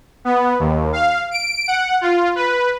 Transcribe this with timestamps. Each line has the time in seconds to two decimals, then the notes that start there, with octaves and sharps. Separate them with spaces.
0.25 B3
0.59 D#2
0.93 F5
1.31 D7
1.68 F#5
2.01 F4
2.36 B4